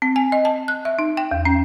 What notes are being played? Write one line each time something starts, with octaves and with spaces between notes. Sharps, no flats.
C4
G#5
D#5
A5
F#6
E5
D#4
G5
E2
C#4